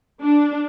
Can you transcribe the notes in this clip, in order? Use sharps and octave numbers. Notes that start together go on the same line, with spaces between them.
D4